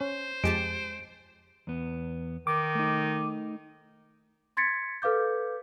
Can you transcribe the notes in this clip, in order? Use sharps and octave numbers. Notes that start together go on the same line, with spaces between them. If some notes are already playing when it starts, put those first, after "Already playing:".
C#4 C5
F2 G#3 G4 A5 D7
E2 B3
D#3 D6
A3 D#4
C6 G#6 A6 B6 C#7
A4 B4 F5 D6 G6